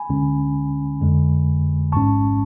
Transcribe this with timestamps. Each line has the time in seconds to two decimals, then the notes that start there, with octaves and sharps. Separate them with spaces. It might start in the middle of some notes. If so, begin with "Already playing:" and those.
Already playing: G#5 B5
0.09 D2 D3 G#3 C#4
1.01 F2 D3 G#3
1.92 A1 G#2 G#3 C#4 A5 C#6